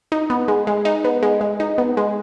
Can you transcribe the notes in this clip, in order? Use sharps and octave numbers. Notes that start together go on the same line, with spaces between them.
D#4
B3
G#3
G#3
D#4
B3
G#3
G#3
D#4
B3
G#3